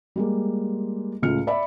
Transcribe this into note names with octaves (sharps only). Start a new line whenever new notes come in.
G3 G#3 A#3
C#2 A2 C#3 F4 F6 C#7
D5 E5 B5